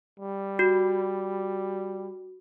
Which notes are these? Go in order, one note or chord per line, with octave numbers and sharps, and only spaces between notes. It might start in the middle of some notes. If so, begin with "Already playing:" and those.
G3
F#4